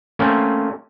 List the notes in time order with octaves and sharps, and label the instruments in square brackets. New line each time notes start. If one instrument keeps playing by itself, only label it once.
[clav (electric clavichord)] A3 A#3 C4 C#4